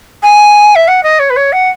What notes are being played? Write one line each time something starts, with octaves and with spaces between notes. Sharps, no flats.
G#5
E5
F#5
D#5
C#5
B4
C#5
F#5